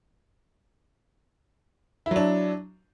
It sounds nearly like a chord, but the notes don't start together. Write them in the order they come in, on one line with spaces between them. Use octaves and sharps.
E4 F#3 D4